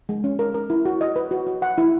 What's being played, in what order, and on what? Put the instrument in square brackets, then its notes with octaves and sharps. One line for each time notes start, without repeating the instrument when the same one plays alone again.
[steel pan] G#3
C#4
A#4
A#4
E4
F#4
D#5
B4
F#4
F#4
F#5
E4